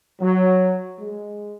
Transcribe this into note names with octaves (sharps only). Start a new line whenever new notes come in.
F#3
G#3